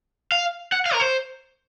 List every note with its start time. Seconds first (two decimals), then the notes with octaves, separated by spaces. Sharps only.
0.32 F5
0.72 F#5
0.86 F5
0.93 A#4
1.00 C5